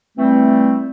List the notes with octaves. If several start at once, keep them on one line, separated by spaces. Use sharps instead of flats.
E3 G3 A3 C4